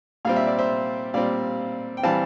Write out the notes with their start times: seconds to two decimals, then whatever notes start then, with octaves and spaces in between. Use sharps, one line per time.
0.25 A#2 G3 C4 F5
0.36 E5
0.47 D5
0.59 C5 E5
1.14 A#2 G3 C4 D5 F5
1.97 G5
2.03 E3 G3 C4 F5 A5